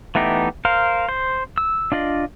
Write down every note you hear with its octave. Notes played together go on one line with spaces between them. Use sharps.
E3 A3 B3 D#4 G4
A#4 C5 F5
C5
E6
D4 F4 D5 D#5